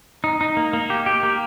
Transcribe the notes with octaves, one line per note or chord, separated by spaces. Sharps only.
D#4
D#4
A#3
A#3
G4
G4
A#3